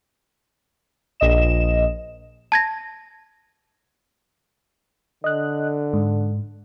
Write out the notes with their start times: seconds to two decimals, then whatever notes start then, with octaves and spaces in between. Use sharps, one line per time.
1.20 A#1 D#5 E7
2.52 A5 G#6 A#6
5.24 D3 D#5 F#6
5.93 G#2